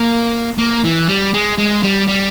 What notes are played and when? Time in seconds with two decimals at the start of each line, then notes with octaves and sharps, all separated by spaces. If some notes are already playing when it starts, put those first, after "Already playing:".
Already playing: A#3
0.58 A#3
0.84 E3
1.08 G3
1.34 G#3
1.58 G#3
1.83 G3
2.08 G3